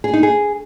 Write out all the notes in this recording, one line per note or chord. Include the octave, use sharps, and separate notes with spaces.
G#4
D#4
G#4